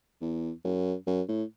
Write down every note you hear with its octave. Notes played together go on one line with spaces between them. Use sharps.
E2
F#2
F#2
A2